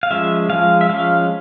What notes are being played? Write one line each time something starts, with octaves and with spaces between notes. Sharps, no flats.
F5
F3 G#3 C#4 E5
F3 G#3 C#4 F5
E5
F3 G#3 C#4 F5